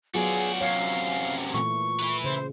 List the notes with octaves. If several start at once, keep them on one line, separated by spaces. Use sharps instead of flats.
F#3 B3 F4 F#4 G#4 D5
F#2 C3 C#5 F5
A#2 E3 A3 C#6
E4 B4
C#3 C5